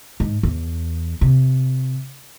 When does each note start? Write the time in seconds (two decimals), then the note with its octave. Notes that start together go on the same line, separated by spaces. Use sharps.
0.20 G#2
0.43 E2
1.21 C3